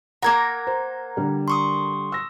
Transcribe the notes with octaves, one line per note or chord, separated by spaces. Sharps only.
A#3 A#4 F#5 A#5 G#6
C5
D3 G3
C6 C#6 D#6
E6 A#6